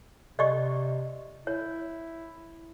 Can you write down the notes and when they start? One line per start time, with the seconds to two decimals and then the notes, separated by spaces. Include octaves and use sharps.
0.39 C3 D5 D#5 C#6
1.47 E4 C#5